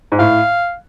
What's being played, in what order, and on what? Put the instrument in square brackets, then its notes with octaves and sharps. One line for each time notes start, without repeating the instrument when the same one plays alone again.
[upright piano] G#2
[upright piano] A2 [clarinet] F5